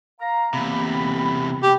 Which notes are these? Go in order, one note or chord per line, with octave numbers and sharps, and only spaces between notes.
F5 A#5
E2 C3 A#3 B5
G4